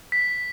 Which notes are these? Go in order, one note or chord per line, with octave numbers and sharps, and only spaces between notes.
B6